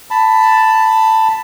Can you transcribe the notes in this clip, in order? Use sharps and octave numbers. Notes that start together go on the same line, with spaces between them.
A5 B5